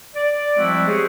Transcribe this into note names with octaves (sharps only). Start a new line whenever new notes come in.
D5
F3 G3 G#3 C4 E4 F#4
C4 G4 G#4 C5 C#5